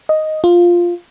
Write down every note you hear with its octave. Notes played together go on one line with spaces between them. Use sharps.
D#5
F4